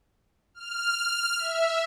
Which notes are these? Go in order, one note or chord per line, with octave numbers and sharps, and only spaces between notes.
F6
E5